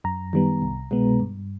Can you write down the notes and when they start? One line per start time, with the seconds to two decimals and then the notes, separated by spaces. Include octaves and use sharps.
0.04 F#2 A#5
0.33 D#3 G3 B3
0.62 C2
0.91 B2 G#3 B3
1.20 G2